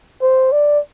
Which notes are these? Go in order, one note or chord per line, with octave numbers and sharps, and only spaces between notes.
C5
D5